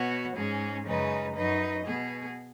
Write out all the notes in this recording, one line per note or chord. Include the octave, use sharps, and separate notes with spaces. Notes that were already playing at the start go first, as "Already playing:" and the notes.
Already playing: B2 B3 F#4 C#5
G#2 G#3 C#4 G#4
F#2 C#3 G#3 D#4 B4
F#2 F#3 D#4 B4 D#5
B2 B3 G#4